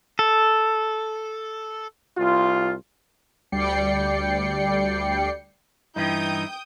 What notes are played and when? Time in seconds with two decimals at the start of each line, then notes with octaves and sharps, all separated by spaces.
0.19 A4
2.18 C2 F4
3.52 D2 G3 D5 G5 C7 C#7
5.96 G2 E3 D#4 E4 G5 D#6 G6